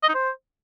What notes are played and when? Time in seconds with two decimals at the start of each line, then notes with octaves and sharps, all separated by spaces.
0.03 D#5
0.09 D#4
0.15 C5